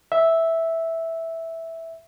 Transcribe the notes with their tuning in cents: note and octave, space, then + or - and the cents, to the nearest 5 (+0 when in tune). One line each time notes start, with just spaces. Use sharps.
E5 -5